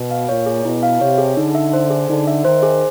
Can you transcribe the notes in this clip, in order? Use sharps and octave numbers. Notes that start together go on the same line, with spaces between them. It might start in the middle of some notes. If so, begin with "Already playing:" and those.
Already playing: B2
F5
A#2 C#5
G#4
B2 E4
F5
C3 C#5
G#4
D3 D#4
E5
C5
G#4
D3 D#4
E5
D#3 C5
G#4